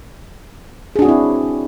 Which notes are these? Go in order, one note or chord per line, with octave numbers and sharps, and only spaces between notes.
C4 D4 E4 F#4 G#4